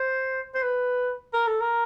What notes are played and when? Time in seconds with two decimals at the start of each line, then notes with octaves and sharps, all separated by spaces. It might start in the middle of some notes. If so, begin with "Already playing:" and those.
Already playing: C5
0.55 C5
0.62 B4
1.33 A#4
1.47 A4
1.61 A#4